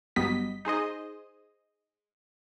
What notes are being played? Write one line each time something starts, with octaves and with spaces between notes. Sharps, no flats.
G1 F#3 G3 B3 D#5 B6
D#4 G#4 C5 D#5